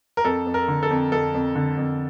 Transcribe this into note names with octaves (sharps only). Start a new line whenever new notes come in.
A#4
F2 A4
F2
A#4
D3
A4
F2
F2 A4
F2
D3
F2